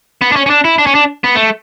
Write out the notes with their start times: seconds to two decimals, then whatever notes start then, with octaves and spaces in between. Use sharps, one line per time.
0.22 B3
0.32 D4
0.36 C#4
0.46 C#4
0.50 D4
0.64 E4
0.78 D4
0.86 C#4
0.95 D4
1.24 B3
1.35 A3